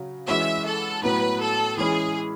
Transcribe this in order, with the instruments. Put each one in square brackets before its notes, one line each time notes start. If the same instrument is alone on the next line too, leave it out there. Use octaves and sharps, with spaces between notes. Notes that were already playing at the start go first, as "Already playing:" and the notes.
Already playing: [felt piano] C#3 F#3
[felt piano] E3 G#3 C#4 F#4 [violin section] E5
[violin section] A4
[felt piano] A2 F#3 B3 E4 [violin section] B4
[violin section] A4
[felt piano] E3 G#3 C#4 E4 [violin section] G#4